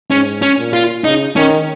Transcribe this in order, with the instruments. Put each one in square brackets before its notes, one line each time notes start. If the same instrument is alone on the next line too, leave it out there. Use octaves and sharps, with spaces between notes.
[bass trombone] G#2 [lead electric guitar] C#4
[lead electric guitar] C#4
[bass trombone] A#2
[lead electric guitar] F4
[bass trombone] C#3 [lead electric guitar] D#4
[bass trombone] D#3 [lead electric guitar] C#4